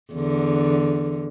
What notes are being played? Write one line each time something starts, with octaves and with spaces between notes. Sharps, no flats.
E2 D3